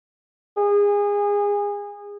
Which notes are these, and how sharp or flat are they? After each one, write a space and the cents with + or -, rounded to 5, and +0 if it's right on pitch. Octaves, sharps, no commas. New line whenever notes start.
G#4 -25